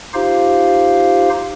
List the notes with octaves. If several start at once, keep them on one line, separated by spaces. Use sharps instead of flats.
D#4 F4 G4 C5 F5